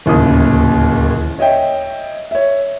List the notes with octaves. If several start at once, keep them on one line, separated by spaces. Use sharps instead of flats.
D1 D#2 A#2 C#3 D#6
C#5 D#5 E5 G5
C#5 E5